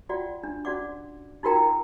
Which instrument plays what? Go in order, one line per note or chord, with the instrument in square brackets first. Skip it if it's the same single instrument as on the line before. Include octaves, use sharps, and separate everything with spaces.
[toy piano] F4 F#4 D5 F#5 G5
D4
C#4 F#4 D5 F#5 D6
D#4 F4 F#4 A#4 G5 A#5